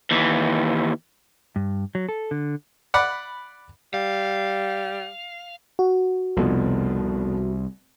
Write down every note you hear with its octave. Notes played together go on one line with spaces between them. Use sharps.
D#2 E3
G2
F#3
A4
D3
D5 F#5 B5
G3 F5
F#4
F1 C2 B2 F3